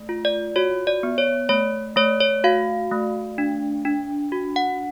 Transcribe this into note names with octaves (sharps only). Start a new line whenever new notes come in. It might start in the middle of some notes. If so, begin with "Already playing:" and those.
Already playing: A3
F4
D5
F#4 C#5
D5
B3
C#5
A3 C#5
A3 C#5
C#5
F#4 F5
A3
D4
D4
F#4
F#5